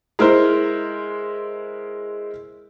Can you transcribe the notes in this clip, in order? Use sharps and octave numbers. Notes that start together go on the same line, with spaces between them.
G#3 E4 A#4 C5